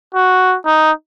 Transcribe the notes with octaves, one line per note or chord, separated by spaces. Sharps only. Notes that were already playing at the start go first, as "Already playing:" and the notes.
F#4
D#4